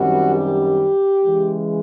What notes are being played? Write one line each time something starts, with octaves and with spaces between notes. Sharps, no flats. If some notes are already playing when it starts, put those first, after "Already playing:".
Already playing: F#2 D#3 G3 C4 F#4
G4
C#3 E3 G#3